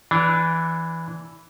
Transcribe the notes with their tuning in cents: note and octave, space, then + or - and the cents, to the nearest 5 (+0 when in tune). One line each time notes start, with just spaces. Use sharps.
E3 +0 D4 -10